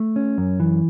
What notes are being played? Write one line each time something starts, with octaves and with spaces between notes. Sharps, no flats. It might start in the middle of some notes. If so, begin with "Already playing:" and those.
Already playing: A3
C#4
F#2
E3